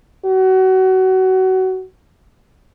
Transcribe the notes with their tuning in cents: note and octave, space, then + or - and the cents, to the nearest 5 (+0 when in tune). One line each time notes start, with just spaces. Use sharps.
F#4 +25